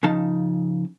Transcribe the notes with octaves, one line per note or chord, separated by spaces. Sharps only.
C#3 F3 D#4 A5